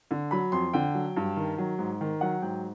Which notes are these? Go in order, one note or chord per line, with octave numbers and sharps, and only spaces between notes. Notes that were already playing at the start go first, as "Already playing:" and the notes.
D3
F#3 B5
F2 C6
D3 G5
F#3
G2
D#3
F#3
G#2
D#3
F#3 F#5
G#2 G5